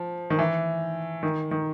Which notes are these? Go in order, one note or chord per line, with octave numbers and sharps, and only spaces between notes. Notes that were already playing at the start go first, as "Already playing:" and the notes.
Already playing: F3
D#3
E3
D#3
D#3